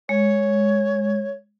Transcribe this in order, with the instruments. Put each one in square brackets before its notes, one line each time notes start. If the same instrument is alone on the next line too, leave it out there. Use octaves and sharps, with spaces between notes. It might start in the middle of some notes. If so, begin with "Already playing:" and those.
[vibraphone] G#3 [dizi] C#5